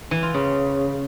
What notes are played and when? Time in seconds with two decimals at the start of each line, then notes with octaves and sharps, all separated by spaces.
0.11 E3
0.23 F4
0.34 C#3